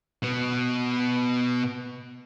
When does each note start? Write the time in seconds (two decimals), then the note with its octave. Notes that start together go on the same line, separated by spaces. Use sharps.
0.23 B2 B3